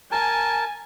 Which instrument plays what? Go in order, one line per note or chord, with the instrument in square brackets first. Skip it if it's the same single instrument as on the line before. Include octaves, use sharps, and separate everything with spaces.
[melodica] A#4 A5 [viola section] G#5